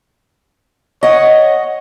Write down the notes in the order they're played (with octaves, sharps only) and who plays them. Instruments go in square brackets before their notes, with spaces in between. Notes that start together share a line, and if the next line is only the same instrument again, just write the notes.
[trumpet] C#5 [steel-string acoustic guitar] D#5 F#5